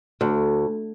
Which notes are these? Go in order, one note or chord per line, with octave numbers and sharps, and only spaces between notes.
D2